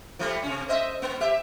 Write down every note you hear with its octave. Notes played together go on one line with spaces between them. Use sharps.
F3 G3 A3
C3 C#4
C5 D#5 E5
A#3
G4 E5